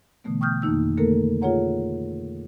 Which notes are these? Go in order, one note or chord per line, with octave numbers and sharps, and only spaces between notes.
B2 D3 E3 A3 B3
G5 C#6 D#6 F6 G6
F2 D#3 A#3 D#4 E6
D3 A3 A#3 A4 A#4
F4 G#4 C#5 F#5 A#5